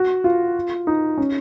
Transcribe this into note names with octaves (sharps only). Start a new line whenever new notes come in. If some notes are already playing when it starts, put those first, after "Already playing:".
Already playing: F#4
F4
D#4
C#4